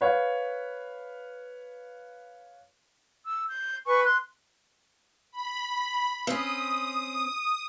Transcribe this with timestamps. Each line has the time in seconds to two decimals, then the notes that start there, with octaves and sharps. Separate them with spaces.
0.01 B4 C#5 F5
3.25 E6
3.49 G6
3.86 B4 G#5 C#6
4.04 C6 F#6
5.32 B5
6.27 C4 C#4 D#6